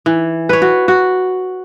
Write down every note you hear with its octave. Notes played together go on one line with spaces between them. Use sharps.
E3
B4 C#5
F#4
F#4